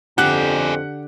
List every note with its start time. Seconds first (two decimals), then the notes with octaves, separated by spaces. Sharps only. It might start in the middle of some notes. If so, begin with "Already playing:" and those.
0.18 F2 D3 G4 G#4 D5 F#5 F#6